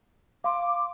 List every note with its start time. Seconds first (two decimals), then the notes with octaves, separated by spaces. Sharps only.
0.44 F5 C6 D6